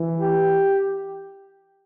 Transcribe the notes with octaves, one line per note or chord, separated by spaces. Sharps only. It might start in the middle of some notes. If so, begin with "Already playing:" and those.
Already playing: E3
G4